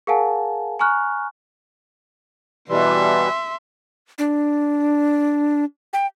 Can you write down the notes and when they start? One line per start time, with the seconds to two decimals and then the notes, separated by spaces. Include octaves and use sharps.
0.07 G#4 A#4 F5 F#5 G#5 A5
0.79 G#5 A#5 C#6 F6 F#6
2.69 B2 E3 G3 E5 C6
4.18 D4
5.93 G5